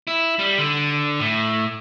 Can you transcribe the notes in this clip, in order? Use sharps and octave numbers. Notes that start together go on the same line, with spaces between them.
E4
G3
D3
A2